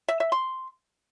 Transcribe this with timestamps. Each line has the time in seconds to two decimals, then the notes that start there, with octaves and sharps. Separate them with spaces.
0.08 E5
0.20 E5
0.32 C6